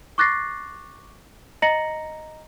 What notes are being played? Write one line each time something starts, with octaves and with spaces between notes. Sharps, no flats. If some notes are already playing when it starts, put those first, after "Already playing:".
C#6 D6 F#6 A6 A#6 C7
D#5 A#5 A#6 C#7 F#7